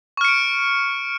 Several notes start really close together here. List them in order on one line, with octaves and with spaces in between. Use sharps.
C#6 F6 C#7 D7